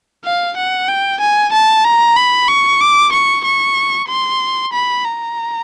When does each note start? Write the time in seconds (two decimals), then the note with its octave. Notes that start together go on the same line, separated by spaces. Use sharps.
0.25 F5
0.57 F#5
0.89 G5
1.21 G#5
1.53 A5
1.85 A#5
2.17 B5
2.49 C#6
2.81 D6
3.13 C#6
3.45 C#6
4.08 C6
4.73 B5
5.05 A#5